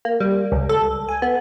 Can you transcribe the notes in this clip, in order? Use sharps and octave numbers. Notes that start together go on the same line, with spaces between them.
A#3
G3
C#2
A4
G#5
B3